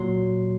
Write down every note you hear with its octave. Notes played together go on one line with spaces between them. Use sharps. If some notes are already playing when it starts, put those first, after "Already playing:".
Already playing: A#2 F#3 C6